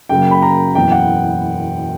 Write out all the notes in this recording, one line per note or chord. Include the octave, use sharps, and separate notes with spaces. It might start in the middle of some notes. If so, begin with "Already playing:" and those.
F#2 C#3 F#3 A#3 G5
B5
A#5
F#1 E2 B2 G5
F#5